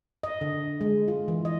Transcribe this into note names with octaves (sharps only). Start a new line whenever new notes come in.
D#5
D3
G#3
F4
E3
D#5